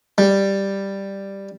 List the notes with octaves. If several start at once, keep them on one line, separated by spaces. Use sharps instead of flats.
G3